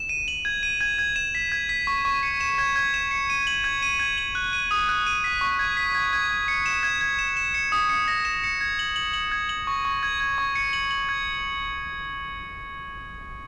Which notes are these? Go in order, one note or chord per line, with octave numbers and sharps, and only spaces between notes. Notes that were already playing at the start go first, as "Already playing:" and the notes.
Already playing: E7
D#7
F#7
G#6
D#7
G#6
G#6
E7
B6
G#6
B6
C#6
C#6
C#7
E7
G#6
G#6
E7
C#7
D#7
F#7
G#6
D#7
G#6
F#7
F#6
D#7
D#6
F#6
D#7
B6
C#6
G#6
B6
G#6
G#6
G#6
C#7
E7
G#6
G#6
E7
E7
C#7
D#6
C#7
A#6
E7
C#7
G#6
F#7
F#7
F#7
G#6
F#7
C#6
C#6
G#6
G#6
C#6
C#7
F#7
F#7
G#6